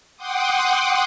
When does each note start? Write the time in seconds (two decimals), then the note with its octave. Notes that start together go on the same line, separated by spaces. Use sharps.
0.16 F#5 G5 C6 D6 D#6